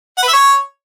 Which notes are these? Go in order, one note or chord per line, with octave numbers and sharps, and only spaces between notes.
F#5
B4
E5
C#5